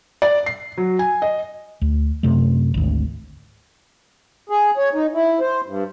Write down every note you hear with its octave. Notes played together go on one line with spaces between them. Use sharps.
D5
C7
F#3
G#5
D#5
D2
F#2 C3 A3
G#1 D2
G#4
C#5
D#4
E4
C5
G2